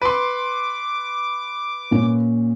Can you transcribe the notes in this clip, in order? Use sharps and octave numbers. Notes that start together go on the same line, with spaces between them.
B4 C6 D6
A#2 C#4